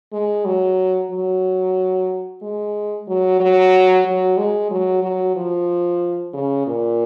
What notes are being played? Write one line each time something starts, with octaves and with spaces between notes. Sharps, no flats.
G#3
F#3
F#3
G#3
F#3
F#3
F#3
G#3
F#3
F#3
F3
C#3
A#2